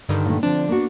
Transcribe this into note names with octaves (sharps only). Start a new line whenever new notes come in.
G2 D3 D#3
A#2 A3
D3 F3 C4 D4
A#3 B3 F#4